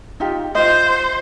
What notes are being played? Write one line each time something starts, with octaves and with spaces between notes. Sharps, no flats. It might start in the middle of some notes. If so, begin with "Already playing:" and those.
D#4 F4 G4
F4 C5 D#5